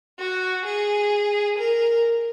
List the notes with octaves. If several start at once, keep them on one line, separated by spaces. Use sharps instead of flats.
F#4
G#4
A#4